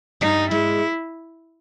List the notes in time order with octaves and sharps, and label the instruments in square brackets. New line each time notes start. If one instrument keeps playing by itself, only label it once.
[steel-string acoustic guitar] G2 G3 [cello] D#4
[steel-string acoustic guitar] G#2 G#3 [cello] E4